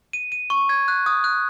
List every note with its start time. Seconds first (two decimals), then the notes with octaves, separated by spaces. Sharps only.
0.13 D#7
0.32 D#7
0.50 C#6
0.69 G#6
0.88 F#6
1.06 D#6
1.24 F#6